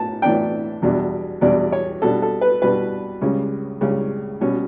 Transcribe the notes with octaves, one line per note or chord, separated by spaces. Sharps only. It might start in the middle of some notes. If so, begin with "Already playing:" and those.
Already playing: A2 B3 A5
A2 E3 B3 D4 G5
E2 B2 G3 D4
E2 B2 G3 D4 D5
C#5
B2 G3 D4 A4
A4
B4
B2 G3 D4 B4
C#2 C#3 G3 C#4
C#2 C#3 G3 C#4
B2 G3 C#4